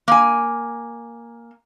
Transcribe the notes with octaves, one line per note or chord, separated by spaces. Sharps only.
A#3 G#5